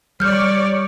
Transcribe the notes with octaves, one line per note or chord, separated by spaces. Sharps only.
G3 C#5 D5 F6 G6